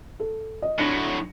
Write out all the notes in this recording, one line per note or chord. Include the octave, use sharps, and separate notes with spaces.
A4
D#5
A2 F#3 D4 A#6 C#7